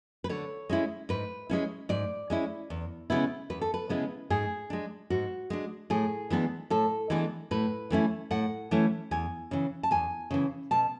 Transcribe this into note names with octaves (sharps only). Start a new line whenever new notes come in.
B4
D3 C#5
G#3 C#4 E4
G#2 B4
G#3 C#4 E4
G#2 D5
G#3 C#4 E4
E2
C#3 G#3 B3 E4
E2 B4
A4
B4
C#3 G#3 B3 E4
G#2 G#4
G#3 D4
G#2 F#4
G#3 D4
A2 G#4
E3 G#3 B3 D4
A2 A4
E3 G#3 B3 D4
A2 B4
E3 A3 C#4 E4
A2 F#5
E3 A3 C#4 E4
E2 G#5
C#3 E3
A5
E2 G#5
C#3 E3
B2 A5